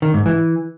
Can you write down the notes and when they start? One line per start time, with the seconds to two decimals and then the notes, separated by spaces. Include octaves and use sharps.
0.02 D#3
0.14 G#2
0.26 E3